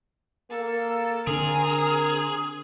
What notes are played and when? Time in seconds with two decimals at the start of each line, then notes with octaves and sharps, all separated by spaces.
0.51 A#3 A4
1.27 D3 C4 D4 G#4 A#4 F6